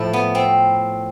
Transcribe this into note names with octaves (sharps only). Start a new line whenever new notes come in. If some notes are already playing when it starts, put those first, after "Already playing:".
Already playing: A2 F3 E4
B3
C4